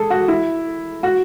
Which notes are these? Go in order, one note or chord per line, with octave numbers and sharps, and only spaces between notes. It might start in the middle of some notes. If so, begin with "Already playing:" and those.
Already playing: G#4 A4
F#4
E4
F#4